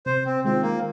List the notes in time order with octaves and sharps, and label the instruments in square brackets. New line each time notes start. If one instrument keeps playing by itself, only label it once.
[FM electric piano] C3 [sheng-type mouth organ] C5
[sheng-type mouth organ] C4
[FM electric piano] D#3 G#3 F4 [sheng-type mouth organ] C4
[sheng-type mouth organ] A#3